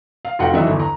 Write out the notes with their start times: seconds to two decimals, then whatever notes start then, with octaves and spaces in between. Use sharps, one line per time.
0.25 F5
0.39 F1 F4 F#4 F#5 G5
0.54 E3 F#3 D4 D#4 E5
0.67 G1 E2
0.80 A#5